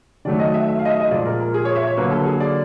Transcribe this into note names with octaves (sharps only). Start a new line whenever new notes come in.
D#3 F#3 A3 D5
D#5
E5
E5
F5
D#5
E5
D#5
A#2 F3 G#3 D5
A#4
A#4
G#4
C#5
E5
C#5
D3 F#3 A#3 B4
A4
G#4
D5